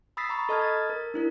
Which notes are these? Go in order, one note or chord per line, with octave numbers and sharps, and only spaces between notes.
B5 D#6 E6 A6 B6 C7
A#5 B5 C#6
A4 D#5 A5 D#6 F6 G#6
A6
A#4
D4 E4 A#4